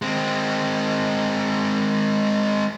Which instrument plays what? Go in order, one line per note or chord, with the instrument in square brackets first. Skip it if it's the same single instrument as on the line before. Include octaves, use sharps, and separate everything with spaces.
[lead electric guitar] G#3 C4